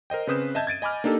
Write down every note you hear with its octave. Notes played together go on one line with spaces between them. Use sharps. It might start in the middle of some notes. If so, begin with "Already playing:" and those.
A#4 C5 D#5 G5
C#3 C4 B4 D#6 G6 E7
D#5 E5 A5 G6 G#6
G#6 A6 D7 D#7
D#5 G#5 B5 D6 F6
A#3 D4 D#4 G4 A4